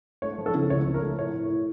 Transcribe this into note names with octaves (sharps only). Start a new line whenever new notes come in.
A3 C#5
F3
A4
C#3
C#2 C#5
F3
A#4
A3
A2 C#5
A2
A2